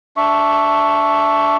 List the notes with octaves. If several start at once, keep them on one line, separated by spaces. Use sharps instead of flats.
D4 E5 C#6